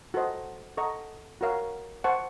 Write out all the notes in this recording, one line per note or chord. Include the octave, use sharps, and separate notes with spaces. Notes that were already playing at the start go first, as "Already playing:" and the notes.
F#4 A4 C5 D#5
A4 D#5 F#5 A#5 C#6
F#4 A#4 C#5 F5
C5 F#5 A5 C#6